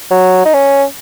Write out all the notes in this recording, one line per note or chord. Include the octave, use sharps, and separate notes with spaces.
F#3
D#4
C#4